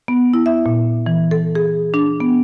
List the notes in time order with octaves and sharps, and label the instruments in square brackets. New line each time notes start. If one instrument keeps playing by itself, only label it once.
[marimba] B3
E4
E5
A#2
E3
A4
G#4
D4
B3